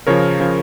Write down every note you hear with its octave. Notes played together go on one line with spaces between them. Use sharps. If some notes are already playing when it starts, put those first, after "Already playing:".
C#3 F3 A#4 C#5
C#3 F3